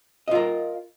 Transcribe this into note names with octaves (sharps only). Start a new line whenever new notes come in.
F4 A#4 D#5